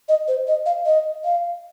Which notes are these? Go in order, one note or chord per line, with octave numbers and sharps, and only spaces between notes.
D#5
C5
D#5
F5
D#5
F5